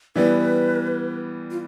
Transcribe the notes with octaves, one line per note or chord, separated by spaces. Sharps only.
E3 G3 B3 B4
F4